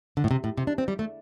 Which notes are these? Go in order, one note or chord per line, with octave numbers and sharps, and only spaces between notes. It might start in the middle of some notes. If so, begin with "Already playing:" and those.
D3
A2
C3
A2
C3
D4
C4
G3
A3